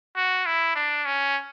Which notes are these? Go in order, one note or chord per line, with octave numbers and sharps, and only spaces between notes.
F#4
E4
D4
C#4